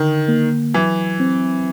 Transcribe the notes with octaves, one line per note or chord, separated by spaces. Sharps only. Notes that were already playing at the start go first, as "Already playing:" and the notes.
Already playing: D3 D#3
A#3
E3 F#3
C4